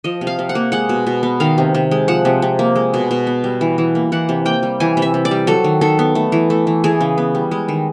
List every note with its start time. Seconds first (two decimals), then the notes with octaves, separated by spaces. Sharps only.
0.04 F3 D#5
0.21 C3
0.27 F5
0.39 C3
0.49 F#5
0.55 A#3
0.72 G#3 F#5
0.89 B2
1.07 B2
1.23 B3
1.40 D#3 F5
1.58 C3
1.74 C3
1.91 G#3
2.08 F3 F#5
2.25 C3
2.42 C3
2.59 A#3
2.76 G#3
2.94 B2
3.11 B2
3.27 B3
3.44 G3
3.61 E3
3.78 E3
3.95 A#3
4.12 E3 F#5
4.29 C3
4.45 A#3 G5
4.63 G3
4.80 E3 G#5
4.97 C3
5.02 E5
5.14 C3
5.25 D5
5.31 G3
5.47 F#3 A4
5.64 D#3
5.81 D#3 A4
5.99 B3
6.15 A3
6.32 E3
6.50 A3
6.67 E3
6.84 E3 G#4
7.01 C#3
7.18 B3
7.35 G3
7.51 G#3
7.68 D#3